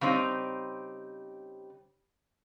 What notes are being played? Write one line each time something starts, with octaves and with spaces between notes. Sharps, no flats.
C#3 G3 C4 D#4